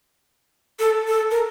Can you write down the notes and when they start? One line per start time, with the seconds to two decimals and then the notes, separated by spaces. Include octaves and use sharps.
0.79 A4
1.08 A4
1.31 A#4